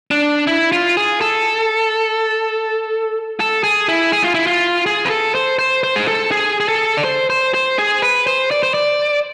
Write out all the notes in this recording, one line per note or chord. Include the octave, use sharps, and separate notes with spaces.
D4
E4
F4
G#4
A4
A4
G#4
E4
G#4
F4
E4
F4
G#4
B4
A4
C5
C5
C5
G#4
A4
G#4
G#4
A4
D5
C5
C5
C5
G#4
B4
C5
D5
C5
D5